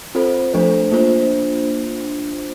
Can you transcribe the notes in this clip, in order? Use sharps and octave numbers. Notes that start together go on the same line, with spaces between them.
C4 F4 A4 C5
F3 A3 D4 A4 C5
A#3 D4 F4 C5